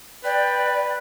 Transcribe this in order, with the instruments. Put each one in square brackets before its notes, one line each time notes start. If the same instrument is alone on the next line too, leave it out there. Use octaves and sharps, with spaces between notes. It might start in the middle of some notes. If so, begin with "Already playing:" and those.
[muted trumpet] B4 [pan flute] D5 [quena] G5